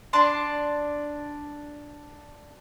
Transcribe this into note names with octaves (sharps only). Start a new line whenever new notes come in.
D4 A5 C6